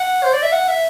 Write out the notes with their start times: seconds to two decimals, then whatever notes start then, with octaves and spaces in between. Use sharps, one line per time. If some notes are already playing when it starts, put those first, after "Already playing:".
Already playing: F#5
0.23 C5
0.33 D5
0.42 E5
0.52 F#5
0.68 E5